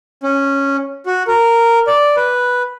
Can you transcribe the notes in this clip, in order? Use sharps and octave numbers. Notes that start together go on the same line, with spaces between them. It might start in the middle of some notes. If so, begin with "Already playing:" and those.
C#4
F#4
A#4
D5
B4